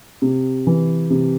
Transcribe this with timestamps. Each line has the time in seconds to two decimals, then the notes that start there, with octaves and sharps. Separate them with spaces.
0.22 C3
0.67 E3
1.10 C3